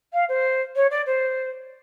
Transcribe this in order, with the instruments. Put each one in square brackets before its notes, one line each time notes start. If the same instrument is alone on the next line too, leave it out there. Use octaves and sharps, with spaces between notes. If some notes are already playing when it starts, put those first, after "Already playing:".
[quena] F5
C5
C#5
D5
C5